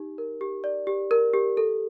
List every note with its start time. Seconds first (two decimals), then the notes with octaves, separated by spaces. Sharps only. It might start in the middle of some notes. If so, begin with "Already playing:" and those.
Already playing: D#4 G4
0.18 A#4
0.41 G4
0.64 D5
0.87 G4
1.11 A#4
1.34 G4
1.57 A4